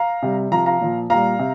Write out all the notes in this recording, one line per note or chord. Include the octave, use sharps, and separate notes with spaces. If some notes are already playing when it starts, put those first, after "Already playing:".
Already playing: F5 A#5
C3 G3
C3 F3 F5 A#5
F5 A#5
A#2 F3
A#2 G3 F5 A#5
C3